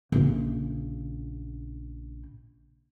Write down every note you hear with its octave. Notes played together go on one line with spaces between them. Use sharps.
A#1 C#3